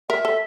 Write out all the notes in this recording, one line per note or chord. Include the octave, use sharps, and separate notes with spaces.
A#4 E5
A4